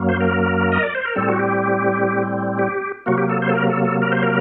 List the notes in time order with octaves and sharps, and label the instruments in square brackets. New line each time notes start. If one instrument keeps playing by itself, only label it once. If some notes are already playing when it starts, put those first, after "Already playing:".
Already playing: [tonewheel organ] F#2 F#3 A#3
C5
A#4
D#5
D5
C5
A#4
A2 G3 C4 A4
F#4
G4
G4
C3 F#3 A#3 F#4
G4
A4
C5
A4
A#4
A4
A4
A#4
C5
A#4